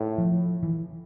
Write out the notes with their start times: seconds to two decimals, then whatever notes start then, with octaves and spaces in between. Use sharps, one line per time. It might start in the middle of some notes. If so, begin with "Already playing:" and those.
Already playing: A2
0.18 F3
0.63 E3